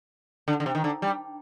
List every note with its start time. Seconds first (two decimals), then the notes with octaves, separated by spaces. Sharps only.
0.48 D3
0.60 D3
0.66 C3
0.75 D#3
0.84 D3
1.02 G3